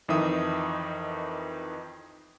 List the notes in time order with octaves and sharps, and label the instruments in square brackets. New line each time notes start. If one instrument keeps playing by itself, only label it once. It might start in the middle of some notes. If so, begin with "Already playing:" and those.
[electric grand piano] F2 D#3 E3 D#4 E5 D#6